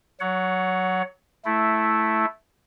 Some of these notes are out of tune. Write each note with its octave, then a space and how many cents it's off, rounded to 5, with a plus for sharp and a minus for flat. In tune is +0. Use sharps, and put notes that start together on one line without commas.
F#3 +0 C#5 +20 F#5 +0
A3 -5 E4 +0